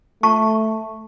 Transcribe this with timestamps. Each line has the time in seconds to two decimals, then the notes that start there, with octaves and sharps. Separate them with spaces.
0.23 A3 A5 C#6